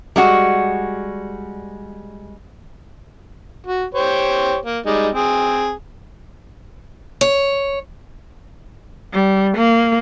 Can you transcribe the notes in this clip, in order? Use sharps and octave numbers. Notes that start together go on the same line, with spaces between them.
G3 G#3 F#4
F#4
G4 C5 C#5
A#3
G3 G#3 D#4
C4 G#4
C#5
G3
A#3